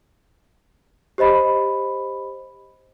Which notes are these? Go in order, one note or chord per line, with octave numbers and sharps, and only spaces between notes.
G4 C5 D#5 B5